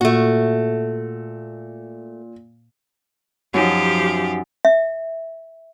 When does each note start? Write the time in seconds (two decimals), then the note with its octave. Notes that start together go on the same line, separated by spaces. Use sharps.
0.01 A#2 A3 F#4
3.54 F#2 F3 D#4 G4
4.65 E5